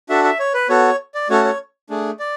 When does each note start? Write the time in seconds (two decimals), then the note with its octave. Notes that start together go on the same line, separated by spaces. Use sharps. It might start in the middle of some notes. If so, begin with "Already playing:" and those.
0.09 D4 F#4 A4 E5
0.24 E5
0.39 C#5
0.54 B4
0.69 B3 F#4 A4 C#5
1.14 D5
1.29 A3 C#4 F#4 A4 C#5
1.45 C#5
1.90 A3 D4 G#4
2.19 D5